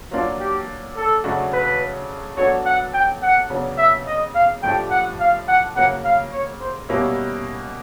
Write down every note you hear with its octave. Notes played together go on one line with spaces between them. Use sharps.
F#3 A#3 D4 F4
G4
A4
C#3 F#3 A3 D4 F#4
B4
F#3 B3 D4 F#4 A4 C#5
F#5
G5
F#5
C#3 F#3 B3 D4
E5
D#5
F5
A2 F3 A3 D4 G4 G5
F#5
F5
F#5
C#3 F#3 A#3 F#5
F5
C#5
C5
B2 G3 A#3 C#4 E4